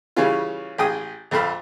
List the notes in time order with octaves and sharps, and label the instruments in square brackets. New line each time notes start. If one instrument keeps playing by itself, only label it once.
[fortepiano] C#3 E3 G3 C#4 F4
A1 G#4 G5 D#6
A#1 F2 A4 F5 B5